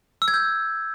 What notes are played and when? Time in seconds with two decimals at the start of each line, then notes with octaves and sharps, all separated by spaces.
0.22 E6
0.28 G#6
0.34 G6